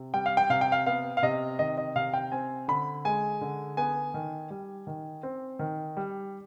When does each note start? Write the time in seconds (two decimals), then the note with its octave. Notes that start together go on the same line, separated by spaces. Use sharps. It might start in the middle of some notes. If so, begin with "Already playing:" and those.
Already playing: C3
0.14 G3 G5
0.26 F5
0.37 G5
0.50 C3 F5
0.61 G5
0.72 F5
0.86 B3 F5
1.17 F5
1.23 C3 D#5
1.59 D#3 D#5
1.78 D#5
1.95 C3 F5
2.14 G5
2.32 C4 G#5
2.68 D3 B5
3.05 G#3 G#5
3.41 D3
3.77 B3 G#5
4.14 D#3
4.50 G3
4.87 D#3
5.23 C4
5.59 D#3
5.97 G3